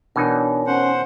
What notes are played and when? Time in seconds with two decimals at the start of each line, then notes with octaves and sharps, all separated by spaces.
0.16 B2 E3 D4 D#4 A#4 C#5
0.67 C#4 C5 F#5